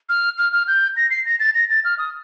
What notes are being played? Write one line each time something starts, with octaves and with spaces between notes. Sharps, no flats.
F6
F6
F6
G6
A#6
C7
A#6
A6
A#6
A6
F6
D#6